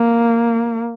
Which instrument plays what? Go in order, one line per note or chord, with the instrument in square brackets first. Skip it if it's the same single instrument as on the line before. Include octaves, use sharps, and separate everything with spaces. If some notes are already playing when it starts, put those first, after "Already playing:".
Already playing: [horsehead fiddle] A#3